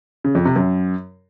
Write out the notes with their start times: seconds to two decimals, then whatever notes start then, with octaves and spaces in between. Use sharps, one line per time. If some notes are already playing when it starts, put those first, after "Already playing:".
0.24 C#3
0.35 F2
0.45 C3
0.56 F#2